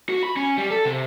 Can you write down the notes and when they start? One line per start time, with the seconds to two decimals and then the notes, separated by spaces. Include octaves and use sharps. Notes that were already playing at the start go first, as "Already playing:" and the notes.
0.09 F#4
0.23 B5
0.36 C#4
0.57 G3
0.70 A4
0.85 C3